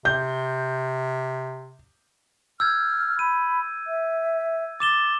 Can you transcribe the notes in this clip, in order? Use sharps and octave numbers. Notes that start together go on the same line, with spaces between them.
C3 G6
E6 F6 G6 G#6
B5 D#7
E5
D6 A6 E7 G7